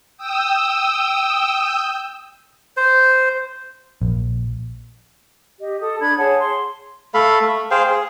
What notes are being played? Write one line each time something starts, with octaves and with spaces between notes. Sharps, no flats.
G5 D#6 E6
C5
A#1
G4 D#5
A4 D#6
D4 B5 G#6
G#4 C#5 F#5 A5
C6
A3 A4 F5 B5
A3
G#4 C5 F5 G5
G#4